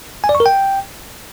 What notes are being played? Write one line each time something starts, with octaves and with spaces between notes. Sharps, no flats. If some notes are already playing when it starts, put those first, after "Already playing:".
G#5
D5
C#6
A#4
G5